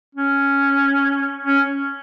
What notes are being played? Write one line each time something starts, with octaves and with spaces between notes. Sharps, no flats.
C#4
C#4